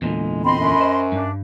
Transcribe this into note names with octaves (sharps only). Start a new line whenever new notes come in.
E2 A#2 D3 G#3
C4 D#5 B5 C6
F#2
C5
G2 D4